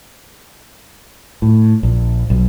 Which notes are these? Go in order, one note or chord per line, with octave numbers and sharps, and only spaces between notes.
A2
A#1
B1